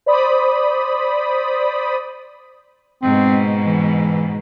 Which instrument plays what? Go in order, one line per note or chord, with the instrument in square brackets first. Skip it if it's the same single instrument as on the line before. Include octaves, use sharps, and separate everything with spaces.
[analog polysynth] C5 D5 B5 D#6
[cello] G#2 B2 [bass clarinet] C4
[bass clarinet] E3